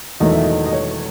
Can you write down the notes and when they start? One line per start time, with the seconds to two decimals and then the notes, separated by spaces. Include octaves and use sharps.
0.20 E1 E2 D#3 F#3 A3 D#5
0.31 E5
0.43 D#5
0.66 D#5
0.73 C#5